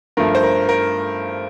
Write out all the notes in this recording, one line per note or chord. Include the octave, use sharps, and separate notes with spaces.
G2 F3 A3 A#4
C5
A#4
A#4